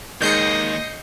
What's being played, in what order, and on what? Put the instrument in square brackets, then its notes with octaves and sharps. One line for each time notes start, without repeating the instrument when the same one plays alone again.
[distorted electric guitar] D#2 [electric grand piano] D#3 G#3 D#4 [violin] D#5 [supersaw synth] G6 C7 C#7